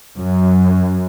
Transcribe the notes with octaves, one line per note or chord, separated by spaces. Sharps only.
F#2